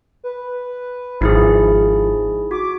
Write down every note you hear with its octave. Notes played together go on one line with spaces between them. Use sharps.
B4
G#1 F3 D#4 E4 G#4
F#4 D6